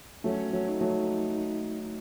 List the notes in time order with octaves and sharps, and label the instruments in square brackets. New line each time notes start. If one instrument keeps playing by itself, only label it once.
[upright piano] F#3 A3 [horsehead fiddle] C#4
[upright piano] F#3 A3
[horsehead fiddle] D#4
[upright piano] F#3 A3